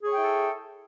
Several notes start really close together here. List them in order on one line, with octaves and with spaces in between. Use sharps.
G#4 C#5 G5 E4 A4